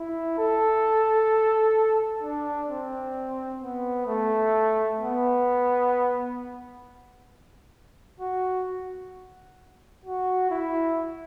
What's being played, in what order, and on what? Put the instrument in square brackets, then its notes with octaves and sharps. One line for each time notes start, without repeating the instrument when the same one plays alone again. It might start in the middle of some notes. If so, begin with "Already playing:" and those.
Already playing: [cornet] E4
A4
D4
C4
B3
A3
B3
F#4
F#4
E4